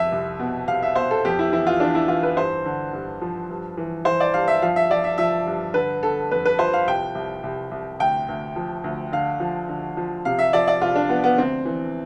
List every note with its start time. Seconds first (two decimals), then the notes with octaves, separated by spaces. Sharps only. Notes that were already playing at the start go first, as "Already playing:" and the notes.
Already playing: F2 E5
0.12 C2
0.39 B2
0.67 C2 F5
0.83 E5
0.95 B2 C5
1.11 A4
1.25 F2 G4
1.39 E4
1.52 E3 E4
1.67 F4
1.80 E3 D4
1.95 E4
2.08 E3 F4
2.23 B4
2.37 G2 C5
2.66 D3
2.93 G2
3.21 F3
3.50 G2
3.77 E3
4.05 E3 C5
4.20 D5
4.34 G2 F5
4.48 E5
4.62 F3 F5
4.76 E5
4.91 F3 D5
5.04 E5
5.18 F3 E5
5.47 G2
5.74 D3 B4
6.03 D3 A4
6.31 F2 B4
6.46 B4
6.59 F3 C5
6.73 F5
6.87 C2 G5
7.15 C2
7.43 C2
7.71 C2
7.99 D2 G5
8.28 D2
8.56 F3
8.84 D2
9.12 D3 F5
9.40 F3
9.69 D3
9.97 F3
10.25 C3 F5
10.39 E5
10.53 F3 D5
10.68 D5
10.82 C2 F4
10.95 D4
11.09 F3 B3
11.24 B3
11.38 D2 C4
11.65 E3